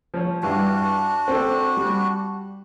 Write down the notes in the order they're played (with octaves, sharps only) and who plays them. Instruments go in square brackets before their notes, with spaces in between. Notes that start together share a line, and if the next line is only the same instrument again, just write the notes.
[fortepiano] F3 F4 C#5
[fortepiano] G2 E3 [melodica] D4 F#4
[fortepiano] C4 A4
G3